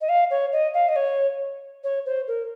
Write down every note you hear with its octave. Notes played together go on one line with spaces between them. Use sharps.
D#5
F5
C#5
D#5
F5
D#5
C#5
C#5
C5
A#4